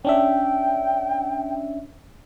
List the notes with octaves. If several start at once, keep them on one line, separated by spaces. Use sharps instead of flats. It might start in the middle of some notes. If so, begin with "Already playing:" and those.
C#4 D4 E5 G5